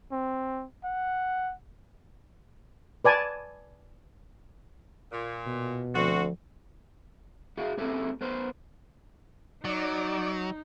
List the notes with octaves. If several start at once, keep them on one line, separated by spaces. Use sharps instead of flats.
C4
F#5
B4 D5 G#5 A5
A#2
B2
D2 F3 C4 F#4
E4 F#4 G#4 F5
A#3 C4 C#4 E4 G4 A4
B3 A#4 C5 B5 C6
F#3 D#4 D5